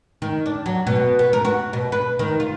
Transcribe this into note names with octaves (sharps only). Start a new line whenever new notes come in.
D#3
D4
F#3
B2
B3
A#4
F#4
B2
B4
D#3
F4